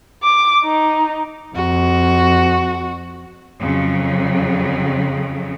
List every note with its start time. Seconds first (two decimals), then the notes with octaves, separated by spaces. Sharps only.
0.23 D6
0.64 D#4
1.56 F2 F#4
3.59 F2 C#3 F#3